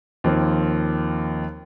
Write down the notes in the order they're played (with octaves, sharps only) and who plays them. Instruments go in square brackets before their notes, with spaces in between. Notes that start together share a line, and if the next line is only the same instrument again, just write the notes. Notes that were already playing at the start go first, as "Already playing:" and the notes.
[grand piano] D#2 F3 A#3 C4